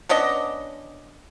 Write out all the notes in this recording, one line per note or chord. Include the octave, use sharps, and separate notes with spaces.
B3 C#4 D4 D#5